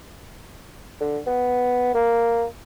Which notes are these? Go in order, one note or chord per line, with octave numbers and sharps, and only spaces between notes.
D3
B3
A#3